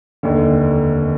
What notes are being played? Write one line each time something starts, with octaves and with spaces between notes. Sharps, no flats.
F1 D#2 D3